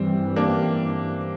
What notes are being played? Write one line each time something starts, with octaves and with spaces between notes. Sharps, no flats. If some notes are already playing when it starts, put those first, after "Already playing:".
Already playing: G2 E3 G3 C4
A#3 D4